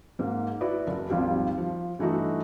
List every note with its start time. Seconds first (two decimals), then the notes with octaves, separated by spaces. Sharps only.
0.19 G#2 A#3
0.61 E4 F#4 B4 D5
0.87 F#1
1.10 G#1 D#2 F3 G3
1.58 F3
1.99 G2 E3 A3 D#4 F#4